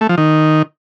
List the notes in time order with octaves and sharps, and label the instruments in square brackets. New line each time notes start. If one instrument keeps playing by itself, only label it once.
[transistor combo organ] A3
F3
D#3